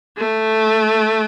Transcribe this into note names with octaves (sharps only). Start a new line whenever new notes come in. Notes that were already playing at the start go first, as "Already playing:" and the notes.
A3